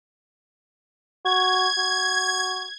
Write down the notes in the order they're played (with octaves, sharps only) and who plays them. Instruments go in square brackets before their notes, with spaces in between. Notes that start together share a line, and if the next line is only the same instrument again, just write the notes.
[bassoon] F#4 [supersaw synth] G#6
[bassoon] F#4